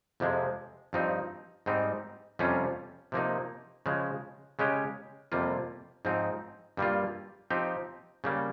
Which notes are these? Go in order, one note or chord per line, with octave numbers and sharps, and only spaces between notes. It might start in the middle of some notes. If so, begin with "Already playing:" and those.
F2 C3 F3 G#3
G2 F3 C4 D#4
G#2 G3 C4 D#4
F2 C3 G3 C#4 F4
C3 F3 A#3 D#4
C#3 F3 G#3
C#3 G#3 C#4 G4
F2 C3 G3 A#3 F4
G#2 F3 C4 D#4
G2 G3 A#3 F4
F3 C4 D#4 G4
C#3 G3 A#3